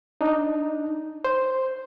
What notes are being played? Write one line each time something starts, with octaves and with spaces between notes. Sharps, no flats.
D4 D#4
C5